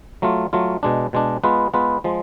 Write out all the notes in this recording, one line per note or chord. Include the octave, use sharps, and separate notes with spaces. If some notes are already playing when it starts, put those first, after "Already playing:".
F#3 A3 F4
F#3 A3 F4
B2 G#3 D4
B2 G#3 D4
G#3 B3 F4 B4
G#3 B3 F4 B4
F3 G#3